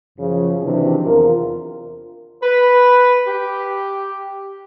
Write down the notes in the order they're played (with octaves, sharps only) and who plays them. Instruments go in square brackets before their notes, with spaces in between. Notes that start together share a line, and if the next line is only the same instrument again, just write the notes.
[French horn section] F#2 C#3 F3
C3 D#3 E3 F#3 D4
E2 F4 A#4
[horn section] B4
G4